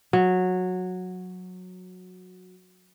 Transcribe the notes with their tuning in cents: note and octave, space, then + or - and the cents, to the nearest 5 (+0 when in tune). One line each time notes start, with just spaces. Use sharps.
F#3 -15